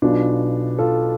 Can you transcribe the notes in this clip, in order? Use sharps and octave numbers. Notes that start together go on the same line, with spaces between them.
B1 B2 D4 F4
F4 A4